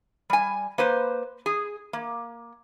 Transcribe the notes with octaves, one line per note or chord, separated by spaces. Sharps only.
G3 G#5
A#3 B4 C5
G#4
A#3